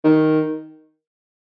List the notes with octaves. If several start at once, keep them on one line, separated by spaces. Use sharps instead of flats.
D#3